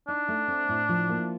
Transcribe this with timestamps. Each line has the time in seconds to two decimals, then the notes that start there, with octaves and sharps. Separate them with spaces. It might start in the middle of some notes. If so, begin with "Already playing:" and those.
0.08 D4 D#4
0.28 A3
0.48 C4
0.69 A2
0.89 F3
1.09 A#3